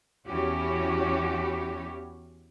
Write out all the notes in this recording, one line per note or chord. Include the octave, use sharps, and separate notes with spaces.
E2 E3 C#4 F#4 G4